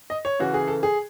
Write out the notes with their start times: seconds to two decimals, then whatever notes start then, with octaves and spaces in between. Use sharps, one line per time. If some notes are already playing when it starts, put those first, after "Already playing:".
0.10 D#5
0.25 C#5
0.39 C#3 E3 F#4
0.54 G#4
0.68 A4
0.83 G#4